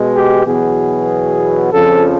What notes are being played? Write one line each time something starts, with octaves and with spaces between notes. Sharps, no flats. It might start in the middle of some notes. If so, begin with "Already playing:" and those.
Already playing: B2 G#3
G4
E2 B2 F#3 B3 G#4
F2 C#3 F3 A4